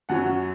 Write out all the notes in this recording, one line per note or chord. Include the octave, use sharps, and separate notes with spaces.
F#2 F#3 C#4 F#5